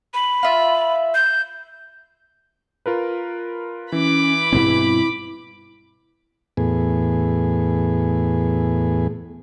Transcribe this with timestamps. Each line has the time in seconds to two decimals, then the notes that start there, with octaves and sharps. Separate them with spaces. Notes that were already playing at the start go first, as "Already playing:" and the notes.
0.14 B5
0.43 F4 E5
1.15 G6
2.86 F4 A#4 B4
3.92 E3 C#4 B5 D6
4.53 G2 B2 C4 E4
6.57 E2 A2 B3 G#4